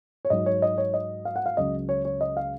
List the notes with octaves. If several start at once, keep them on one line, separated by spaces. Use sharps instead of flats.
C#5
G#2 F#3 D#5
C#5
D#5
C#5
D#5
F5
F#5
F5
C#2 C#3 F#3 D#5
C#5
C#5
D#5
F5